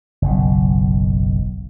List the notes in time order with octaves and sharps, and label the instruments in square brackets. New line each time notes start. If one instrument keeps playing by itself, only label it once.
[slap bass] F#1 B1